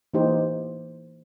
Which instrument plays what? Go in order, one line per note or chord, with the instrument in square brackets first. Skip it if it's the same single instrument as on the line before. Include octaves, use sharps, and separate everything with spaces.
[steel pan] E3 A#3 D#4 G4 C5